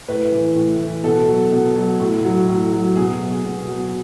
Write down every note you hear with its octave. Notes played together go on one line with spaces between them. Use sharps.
A2 B4
E3
A2
E3
B2 A4
F#3
B2
F#3
A2
F#3
A2
F#3
B2 G#4
F#3
B2
F#3